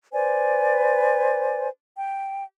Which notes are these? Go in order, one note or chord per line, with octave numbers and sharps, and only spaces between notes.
B4 C5 D5 G#5
G5